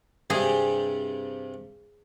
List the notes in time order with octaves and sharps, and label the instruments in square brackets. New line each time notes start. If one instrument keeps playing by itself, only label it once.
[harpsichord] G2 C3 G3 [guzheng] G#4